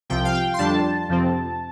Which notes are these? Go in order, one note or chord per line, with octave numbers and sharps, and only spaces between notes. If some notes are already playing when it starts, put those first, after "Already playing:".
C2 C3 F3 G5
F5
G5
C6
F2 D3 G3 D4 A5
F2 C3 F3 C4